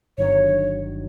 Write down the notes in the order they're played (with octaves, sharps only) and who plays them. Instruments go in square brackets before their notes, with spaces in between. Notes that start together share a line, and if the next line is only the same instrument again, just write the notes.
[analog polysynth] G1 G2 D#3 F#3 [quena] C#5